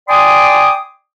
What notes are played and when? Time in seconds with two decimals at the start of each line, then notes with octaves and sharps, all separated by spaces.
0.09 D5 G5 G#5 C6 D6 D#6